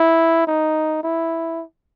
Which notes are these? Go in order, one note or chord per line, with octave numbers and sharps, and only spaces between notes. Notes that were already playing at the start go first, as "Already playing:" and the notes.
Already playing: E4
D#4
E4